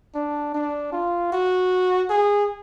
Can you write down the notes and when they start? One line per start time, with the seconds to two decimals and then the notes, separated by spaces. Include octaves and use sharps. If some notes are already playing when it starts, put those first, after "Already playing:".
0.14 D4
0.54 D4
0.92 F4
1.32 F#4
2.09 G#4